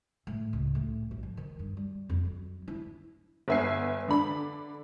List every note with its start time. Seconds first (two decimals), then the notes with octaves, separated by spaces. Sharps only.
0.27 A2
0.53 C#2
0.75 A2
1.11 A1
1.23 F3
1.37 D#3
1.59 G2
1.77 G3
2.09 F2
2.25 F#3
2.68 E4
3.48 G1 B3 E5 G#5 C7
4.08 D3 D4 B5